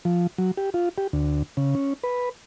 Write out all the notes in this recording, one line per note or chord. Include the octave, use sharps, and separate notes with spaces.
F3
F#3
G4
F4
G4
D2
C#3
C#4
B4